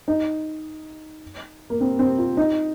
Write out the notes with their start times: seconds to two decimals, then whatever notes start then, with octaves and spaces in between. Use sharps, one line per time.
0.08 D#4
1.70 A#3
1.81 C4
1.99 C4
2.18 F4
2.37 D#4